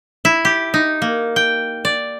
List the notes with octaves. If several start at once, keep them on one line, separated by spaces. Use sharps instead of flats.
E4
G4
D#4
A#3
G5
D5